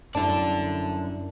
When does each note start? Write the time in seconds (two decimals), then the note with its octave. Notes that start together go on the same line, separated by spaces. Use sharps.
0.15 F#2 G3 D4 E4 A4 D5 A5